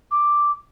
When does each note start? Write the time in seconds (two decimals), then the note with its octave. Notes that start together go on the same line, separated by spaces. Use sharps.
0.11 D6